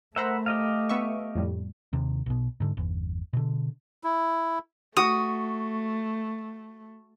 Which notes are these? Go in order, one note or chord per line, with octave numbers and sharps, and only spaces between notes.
A3 A#4 C5 E5 F#5 A#5 B5
G4 D#5 F5
B3 E5 C#6
F2 A2 G3
D#2 C3
B1 B2
G#2 D3
G1 E2
B2 D3
E4
A3 F#4 D#6